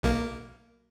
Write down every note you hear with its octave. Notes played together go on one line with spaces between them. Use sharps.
B1 A#3